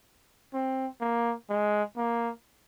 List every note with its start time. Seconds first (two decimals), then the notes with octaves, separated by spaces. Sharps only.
0.54 C4
1.01 A#3
1.50 G#3
1.97 A#3